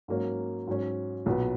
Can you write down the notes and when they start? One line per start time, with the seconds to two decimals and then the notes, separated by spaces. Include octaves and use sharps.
0.08 G#2 F#3 A#3 C#4 F#4
0.67 G#2 F#3 C#4
1.26 B1 A#2 F#3 B3 F#4